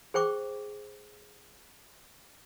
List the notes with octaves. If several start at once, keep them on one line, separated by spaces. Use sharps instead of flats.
G#4 C5 G5 C#6 D6